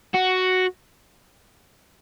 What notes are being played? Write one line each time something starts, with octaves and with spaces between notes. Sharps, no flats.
F#4